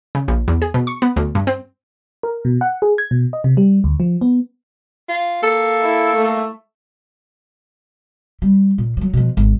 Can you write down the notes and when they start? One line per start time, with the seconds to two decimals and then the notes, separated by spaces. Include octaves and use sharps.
0.15 C#3
0.28 A#1
0.48 E2
0.62 G#4
0.74 B2
0.87 C#6
1.02 B3
1.16 D2
1.35 G2
1.47 C4
2.23 A#4
2.45 B2
2.61 F#5
2.82 G#4
2.98 G#6
3.11 B2
3.33 D#5
3.44 C3
3.57 G3
3.84 D2
4.00 F3
4.21 B3
5.09 F4
5.43 A#3 A4
5.82 E4
6.16 A3
8.42 G3
8.78 A#2
8.97 F3 F#3
9.13 B2 F3
9.37 G#1